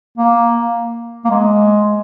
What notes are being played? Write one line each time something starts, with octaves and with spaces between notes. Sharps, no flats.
A#3
A#3
G#3